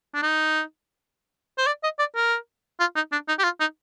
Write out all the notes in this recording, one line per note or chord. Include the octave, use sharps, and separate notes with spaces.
D4
D#4
C5
D5
D#5
D5
A#4
F4
D#4
D4
D#4
G4
F4
D#4